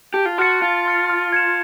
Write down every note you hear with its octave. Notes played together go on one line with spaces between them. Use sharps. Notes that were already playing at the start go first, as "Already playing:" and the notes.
G4 A5
F4
F#4 C6 F6 A6 C#7
F4 A5
C6 F6 A6 C#7
F6
G#6 C#7 E7